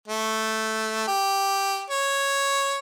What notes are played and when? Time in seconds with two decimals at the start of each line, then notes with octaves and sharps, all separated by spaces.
0.08 A3
1.07 G4
1.90 C#5